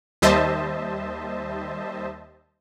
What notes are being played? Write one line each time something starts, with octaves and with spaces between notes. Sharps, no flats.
D#2 G3 C5 D#5 E5 A5